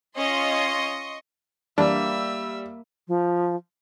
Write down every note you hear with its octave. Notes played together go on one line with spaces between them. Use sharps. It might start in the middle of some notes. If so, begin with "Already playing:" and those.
C#4 F4 D#5 C6 C#6
E3 G3 A#3 D4 E5 E6
F3